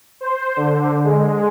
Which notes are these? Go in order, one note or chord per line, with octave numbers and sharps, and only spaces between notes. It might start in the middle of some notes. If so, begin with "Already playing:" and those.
C5
D3
G#3